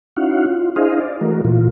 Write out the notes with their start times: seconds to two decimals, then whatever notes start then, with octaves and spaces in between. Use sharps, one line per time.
0.16 C#4 D#4 E4 F#4 F5 F#5
0.46 F4
0.76 D4 E4 G#4 C5 D#5 F5
1.01 D5
1.21 E3 A3 F#4 A#4
1.45 A#2 E3 F4